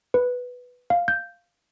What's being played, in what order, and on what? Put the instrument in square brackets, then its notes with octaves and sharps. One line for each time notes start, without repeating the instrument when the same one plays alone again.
[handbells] B4
F5
G6